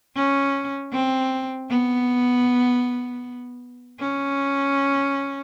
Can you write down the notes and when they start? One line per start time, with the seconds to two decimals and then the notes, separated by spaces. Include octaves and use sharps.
0.16 C#4
0.92 C4
1.70 B3
4.00 C#4